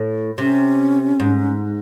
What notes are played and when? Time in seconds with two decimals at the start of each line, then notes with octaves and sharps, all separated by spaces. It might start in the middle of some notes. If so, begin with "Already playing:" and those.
Already playing: A2
0.38 C3 C#4
1.20 G#2